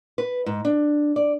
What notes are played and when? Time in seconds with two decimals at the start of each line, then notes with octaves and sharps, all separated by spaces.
0.18 B4
0.46 G#2
0.65 D4
1.16 D5